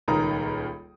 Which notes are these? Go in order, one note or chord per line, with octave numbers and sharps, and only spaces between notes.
D#1 C#2 D#3 A#4 A#5 D#6